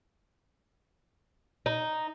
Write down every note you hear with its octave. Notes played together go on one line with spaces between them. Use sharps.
D#4